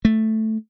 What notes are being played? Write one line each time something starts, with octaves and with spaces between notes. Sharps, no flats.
A3